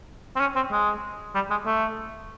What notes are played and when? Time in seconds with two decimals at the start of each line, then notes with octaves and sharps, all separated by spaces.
0.36 C4
0.40 C#4
0.56 C4
0.72 G#3
1.35 G3
1.50 G#3
1.66 A3